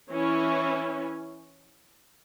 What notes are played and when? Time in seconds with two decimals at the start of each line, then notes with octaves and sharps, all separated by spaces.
0.11 E3 C#4 E4 C#5